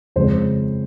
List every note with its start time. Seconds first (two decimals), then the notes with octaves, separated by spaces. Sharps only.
0.16 F2 C#3 G#3 C5